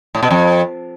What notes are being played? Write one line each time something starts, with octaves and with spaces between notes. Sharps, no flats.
A2
B2
F2